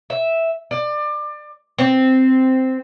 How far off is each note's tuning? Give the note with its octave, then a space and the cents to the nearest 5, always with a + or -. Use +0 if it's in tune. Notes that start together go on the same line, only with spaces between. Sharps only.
E5 -5
D5 +25
C4 -5